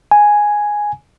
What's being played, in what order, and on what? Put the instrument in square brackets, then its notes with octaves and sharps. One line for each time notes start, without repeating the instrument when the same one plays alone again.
[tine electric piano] G#5